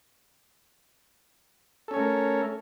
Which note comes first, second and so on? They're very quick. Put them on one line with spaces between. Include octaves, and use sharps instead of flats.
A4 C#4 C#5 A3 A#4